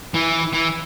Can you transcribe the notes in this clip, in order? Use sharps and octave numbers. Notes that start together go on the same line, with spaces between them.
E3
E3